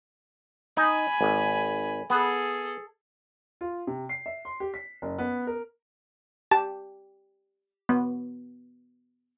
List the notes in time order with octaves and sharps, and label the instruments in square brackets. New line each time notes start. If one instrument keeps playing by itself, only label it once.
[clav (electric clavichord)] D#4 [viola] G#5 B5
[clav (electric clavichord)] G#1
[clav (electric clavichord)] B3 [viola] G#4 A4
[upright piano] F4
C3
C7
E5
C6
G4
B6
F#1
B3
A#4
[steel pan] G4 [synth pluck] A5
[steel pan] B3